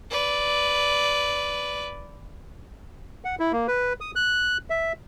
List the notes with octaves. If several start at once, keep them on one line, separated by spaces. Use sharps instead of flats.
B4 D5
F#5
E4
A#3
B4
D#6
F#6
E5